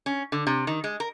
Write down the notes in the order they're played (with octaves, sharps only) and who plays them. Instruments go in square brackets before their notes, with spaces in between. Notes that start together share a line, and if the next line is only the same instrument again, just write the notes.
[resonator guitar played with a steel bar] C#4
D3
C3
D#3
G#3
A#4